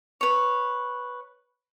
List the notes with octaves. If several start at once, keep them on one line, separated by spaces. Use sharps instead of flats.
B4 C#5